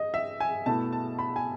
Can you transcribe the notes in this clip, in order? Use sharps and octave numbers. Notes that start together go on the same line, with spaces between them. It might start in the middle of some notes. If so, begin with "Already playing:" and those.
Already playing: D#5
E5
G#5
B2 A3 E4 A5
A5
B5
G#5